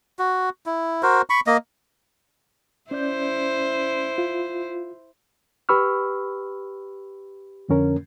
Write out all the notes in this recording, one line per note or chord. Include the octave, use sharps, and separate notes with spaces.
F#4
E4
F#4 A#4 C5
B5 C#6
A#3 D#5
C#4 E4 C5 D5 G6
F4
G4 B4 B5 C#6 E6 F6
F2 D3 C#4 A#4